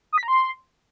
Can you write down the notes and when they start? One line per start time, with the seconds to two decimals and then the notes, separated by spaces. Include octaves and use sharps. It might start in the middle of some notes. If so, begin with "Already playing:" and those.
0.13 D#6
0.18 B6
0.23 A#5
0.28 C6